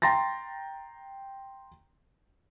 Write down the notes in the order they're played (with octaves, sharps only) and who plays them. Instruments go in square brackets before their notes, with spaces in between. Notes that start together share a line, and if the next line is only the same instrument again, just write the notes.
[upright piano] G5 A#5 C6 A6 A#6